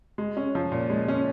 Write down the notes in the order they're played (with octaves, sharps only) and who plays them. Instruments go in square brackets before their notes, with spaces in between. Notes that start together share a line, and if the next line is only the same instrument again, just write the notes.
[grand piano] G#3
C#4
F3
A#2
G#3
C#4